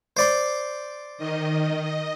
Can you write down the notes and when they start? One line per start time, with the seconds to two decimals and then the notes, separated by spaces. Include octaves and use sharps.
0.17 C5 D5 C6
1.17 D#3 D#5
1.82 D#5